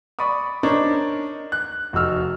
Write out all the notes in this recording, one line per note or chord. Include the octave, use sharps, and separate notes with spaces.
D5 B5 C#6 D#6
D4 D#4 A#4 C5 C#5
F#6
F1 D#4 F#4 E6 F6